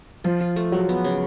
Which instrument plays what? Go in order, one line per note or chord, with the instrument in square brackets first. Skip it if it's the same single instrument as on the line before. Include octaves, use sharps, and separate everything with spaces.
[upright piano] F3 [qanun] F4
[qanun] F4
A3
[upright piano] F#3 [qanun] G#3
[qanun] B3
C#3